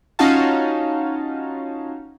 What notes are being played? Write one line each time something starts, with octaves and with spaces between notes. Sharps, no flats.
C#4 D#4 F4 F#4 F5 A5